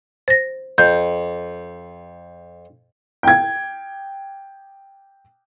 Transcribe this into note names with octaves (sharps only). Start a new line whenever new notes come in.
C5 A#6
F2 G6
G5 G#6